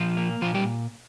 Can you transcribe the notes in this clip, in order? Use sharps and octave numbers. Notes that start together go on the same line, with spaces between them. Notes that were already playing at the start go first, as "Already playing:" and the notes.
Already playing: A#2 F3 F4
A#3
A#2 F3 F4
G3 G4